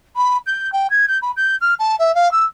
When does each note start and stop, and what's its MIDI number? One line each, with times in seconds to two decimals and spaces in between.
0.16 0.38 83
0.47 0.71 91
0.73 0.87 79
0.90 1.06 92
1.08 1.18 91
1.22 1.32 83
1.37 1.55 91
1.61 1.74 89
1.79 1.96 81
1.99 2.15 76
2.15 2.32 77
2.32 2.45 88